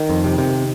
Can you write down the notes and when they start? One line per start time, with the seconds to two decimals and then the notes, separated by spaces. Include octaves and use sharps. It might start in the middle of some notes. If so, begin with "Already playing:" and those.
Already playing: D#3
0.09 F2
0.25 C3
0.38 C3